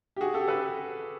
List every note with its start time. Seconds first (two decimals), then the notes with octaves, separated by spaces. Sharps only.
0.16 G4
0.21 F#4 G#4
0.34 G4 A4
0.48 A4 B4